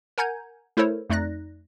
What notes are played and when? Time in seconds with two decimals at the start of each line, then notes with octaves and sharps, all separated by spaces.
0.18 A#4 F#5 G#5 A#5 G6 G#6
0.77 A3 E4 A4 A#4 C5 C#5
1.10 F2 A3 D#4 D5 F#6 A#6